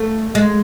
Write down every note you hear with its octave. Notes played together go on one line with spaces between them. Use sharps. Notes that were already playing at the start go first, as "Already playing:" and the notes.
Already playing: A3
G#3